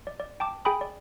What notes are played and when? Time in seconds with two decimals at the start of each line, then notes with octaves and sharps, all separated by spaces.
0.07 D5
0.20 D5
0.40 G5 A5 D6
0.65 G#4 G5 G#5 B5 D#6
0.81 D5